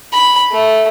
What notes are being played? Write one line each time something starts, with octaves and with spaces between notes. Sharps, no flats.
B5
A3